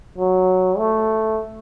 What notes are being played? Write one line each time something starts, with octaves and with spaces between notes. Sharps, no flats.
F#3
A3